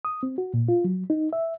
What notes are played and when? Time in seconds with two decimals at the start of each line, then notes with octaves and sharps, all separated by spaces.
0.05 D#6
0.23 C4
0.38 F#4
0.54 A#2
0.68 F4
0.84 F#3
1.10 D#4
1.33 E5